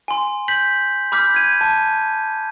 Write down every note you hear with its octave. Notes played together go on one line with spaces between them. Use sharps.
G#5 C6
G6 B6 F#7
B5 D6 F6 G6 B6
G#6 D#7
A5